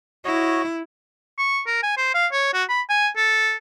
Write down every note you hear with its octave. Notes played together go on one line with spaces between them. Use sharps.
E4 F#4 C#5 D#5
C#6
A#4
G#5
C5
F5
C#5
F#4
B5
G#5
A4